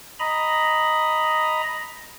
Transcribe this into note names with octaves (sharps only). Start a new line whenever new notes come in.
D#5 A#5 B5